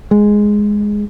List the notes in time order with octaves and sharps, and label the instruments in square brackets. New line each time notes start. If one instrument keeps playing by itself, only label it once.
[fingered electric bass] G#3